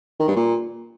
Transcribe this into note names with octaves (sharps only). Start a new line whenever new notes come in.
D#3
G2
A#2